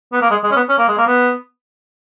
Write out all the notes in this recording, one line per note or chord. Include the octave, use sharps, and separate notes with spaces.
B3
A#3
G#3
G#3
C#4
B3
C#4
A#3
G#3
A#3
B3